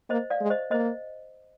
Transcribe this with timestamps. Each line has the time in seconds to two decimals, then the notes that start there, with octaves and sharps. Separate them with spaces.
0.10 A#3 C5 D#5
0.30 D5 F5
0.41 G#3
0.50 C5 D#5
0.71 A#3 C5 D#5